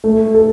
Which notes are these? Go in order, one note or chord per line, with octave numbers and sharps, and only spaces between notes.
A3
A4